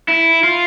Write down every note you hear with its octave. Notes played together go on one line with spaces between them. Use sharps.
E4
F4